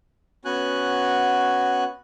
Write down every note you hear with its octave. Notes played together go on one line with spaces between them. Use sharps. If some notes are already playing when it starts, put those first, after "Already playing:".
B3 C#4 F#4 G#5 F#6